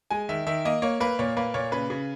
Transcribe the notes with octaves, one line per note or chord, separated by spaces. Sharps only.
G#3 G#5
D#3 E5
D#3 E5
A#3 D#5
A#3 C#5
A#3 B4
A#2 C#5
A#3 B4
A#2 C#5
C#3 B4
C#3